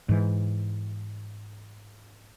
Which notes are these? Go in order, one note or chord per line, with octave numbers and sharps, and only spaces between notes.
G#2 E3